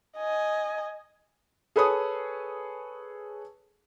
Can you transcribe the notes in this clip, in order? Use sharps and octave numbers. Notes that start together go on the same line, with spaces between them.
D#5 G#5
G#4 A4 B4 C#5 D#6